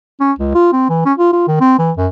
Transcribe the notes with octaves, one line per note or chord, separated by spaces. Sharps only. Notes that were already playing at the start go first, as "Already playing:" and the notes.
C#4
C#2
F4
C4
E3
C#4
F4
F4
D#3
C4
E3
F#2